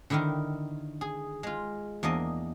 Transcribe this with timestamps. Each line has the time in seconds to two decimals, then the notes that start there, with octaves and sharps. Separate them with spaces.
0.10 D3 D#3 E4 G4 A#4
1.01 G#4
1.43 G#3 F4
2.03 E2 A#3 D4 D#5